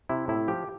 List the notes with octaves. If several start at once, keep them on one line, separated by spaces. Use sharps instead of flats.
C3 E4
A2 E4
F3 G4